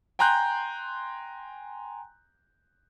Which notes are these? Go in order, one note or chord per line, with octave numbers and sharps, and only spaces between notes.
G5 G#5 A#5 C6 F#6 G6